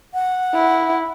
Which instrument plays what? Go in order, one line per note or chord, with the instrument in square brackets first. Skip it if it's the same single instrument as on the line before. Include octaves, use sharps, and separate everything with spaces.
[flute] F#5
[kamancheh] E4